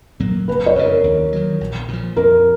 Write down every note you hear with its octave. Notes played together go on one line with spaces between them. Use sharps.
A#2 F#3 A#3
F#1 B4
C#5
F2 C#3
A#4
D#2
D#3 F#3
A#1
A#2 F3
F2 A#4